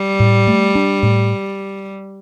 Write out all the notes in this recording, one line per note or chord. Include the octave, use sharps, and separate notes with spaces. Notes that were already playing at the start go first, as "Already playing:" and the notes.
Already playing: G3
A2
A3
D4
A2